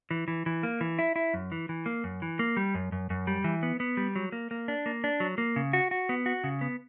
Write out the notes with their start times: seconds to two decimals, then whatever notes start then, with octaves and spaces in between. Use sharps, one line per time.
0.11 E3
0.28 E3
0.46 E3
0.63 A#3
0.81 E3
0.99 E4
1.16 E4
1.34 F#2
1.52 E3
1.69 E3
1.86 A#3
2.04 F#2
2.22 E3
2.39 A#3
2.57 G3
2.75 F#2
2.92 F#2
3.10 F#2
3.27 G3
3.44 E3
3.63 B3
3.80 B3
3.97 G3
4.16 F#3
4.32 A#3
4.51 A#3
4.68 D4
4.86 A#3
5.04 D4
5.20 F#3
5.38 A#3
5.56 C#3
5.73 F#4
5.91 F#4
6.09 B3
6.26 F#4
6.44 C#3
6.61 B3